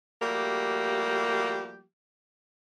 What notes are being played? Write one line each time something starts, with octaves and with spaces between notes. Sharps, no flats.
F3 G3 A3 A#3 F#4 G4